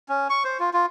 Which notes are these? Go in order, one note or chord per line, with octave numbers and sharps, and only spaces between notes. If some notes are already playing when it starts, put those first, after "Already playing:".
C#4
C#6
C5
F4
F4